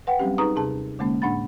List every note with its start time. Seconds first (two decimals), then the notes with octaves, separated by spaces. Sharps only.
0.07 B4 F#5 G5
0.19 F#3 G3 C4 C#4 G4
0.38 D#4 G#4 B4 A#5 C#6 D#6
0.56 D#2 C3 G#4 A5
0.99 D3 G#3 A#3 C#4
1.22 A2 D4 F#5 B5 A6